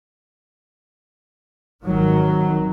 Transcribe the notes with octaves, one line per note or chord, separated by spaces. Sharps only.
G#1 D#3 F#3